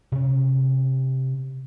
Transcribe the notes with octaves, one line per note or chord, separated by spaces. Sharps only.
C3 C#4